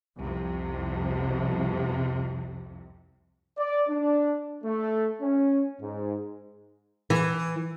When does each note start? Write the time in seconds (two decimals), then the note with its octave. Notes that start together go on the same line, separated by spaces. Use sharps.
0.17 C2 F2 C3
3.58 D5
3.88 D4
4.64 A3
5.21 C#4
5.81 G#2
7.10 E3